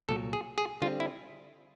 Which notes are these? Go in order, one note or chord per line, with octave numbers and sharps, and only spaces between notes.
C2 A#2 F#3 A4
G#4
G#4
D3 G3 C4 F4
E4